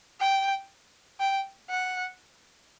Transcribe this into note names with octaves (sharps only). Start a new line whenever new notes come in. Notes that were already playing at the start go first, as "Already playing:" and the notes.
G5
G5
F#5